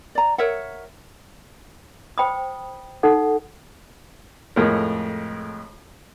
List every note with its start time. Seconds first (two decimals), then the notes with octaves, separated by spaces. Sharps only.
0.15 D5 A#5
0.38 A#4 C#5 E5 F#5
2.18 C5 G5 B5 D#6
3.03 D#4 A4 F#5
4.56 F2 A2 G#3 A#4